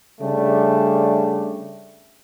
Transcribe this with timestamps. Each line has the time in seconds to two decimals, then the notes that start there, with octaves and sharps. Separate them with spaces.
0.21 C#3 G3 A3 D4